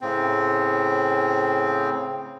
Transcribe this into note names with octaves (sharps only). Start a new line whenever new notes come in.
A2 C#3 C4